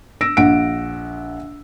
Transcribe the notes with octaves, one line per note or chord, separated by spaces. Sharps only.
E6 A#6 D7
A#1 F#5 D7